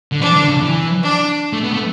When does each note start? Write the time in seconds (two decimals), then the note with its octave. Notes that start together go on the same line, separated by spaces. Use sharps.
0.12 D3
0.21 E3 D4
0.35 D3
0.48 C#3
0.62 E3
1.03 D4
1.53 A3
1.64 B3
1.74 A3